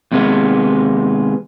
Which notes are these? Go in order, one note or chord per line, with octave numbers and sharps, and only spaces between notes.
D#2 C3 G#3 B3